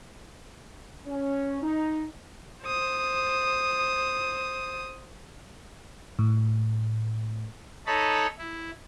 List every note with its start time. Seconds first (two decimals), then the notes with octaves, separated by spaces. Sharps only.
1.06 C#4
1.62 D#4
2.65 C5 D#6
6.19 A2
7.87 D#4 A4 C#5 D#5 A5 B5
8.38 E4